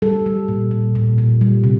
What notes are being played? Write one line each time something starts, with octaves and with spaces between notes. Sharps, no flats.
G3 A4
G3
A#2
A#2
A#2
A#2
G3
C3